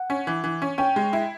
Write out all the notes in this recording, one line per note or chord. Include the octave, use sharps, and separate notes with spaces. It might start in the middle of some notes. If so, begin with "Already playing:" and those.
Already playing: F#5
C#4
E3
E3
C#4
C#4 G5
G#3
E4